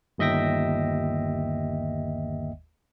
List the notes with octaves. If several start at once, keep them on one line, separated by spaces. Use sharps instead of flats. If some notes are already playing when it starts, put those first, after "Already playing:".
G1 D#2 D#5 E5 G5 A#6